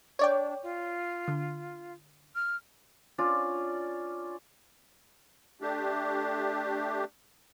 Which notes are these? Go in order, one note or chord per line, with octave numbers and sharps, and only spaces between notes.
D4 C#5 D5 G5
F4
D3
F6
C#4 D4 F4 D5
A3 D4 G4